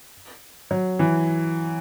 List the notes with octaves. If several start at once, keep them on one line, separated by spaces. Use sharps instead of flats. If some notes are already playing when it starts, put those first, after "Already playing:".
F#3
E3